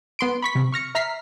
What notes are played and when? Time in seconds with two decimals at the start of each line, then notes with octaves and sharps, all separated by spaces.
0.19 B3 C6 D7
0.42 B5 C#6 B6
0.55 C3
0.72 C#6 F6 A#6 C#7
0.95 E5 A#5 F6 B6 C7